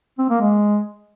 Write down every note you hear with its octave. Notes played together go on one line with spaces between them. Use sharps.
C4
A#3
G#3